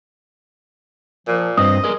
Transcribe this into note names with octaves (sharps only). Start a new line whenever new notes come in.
A#2 F3
G2 C4 B4 C5 D#5 D#6
G#4 A#4 D5 D#5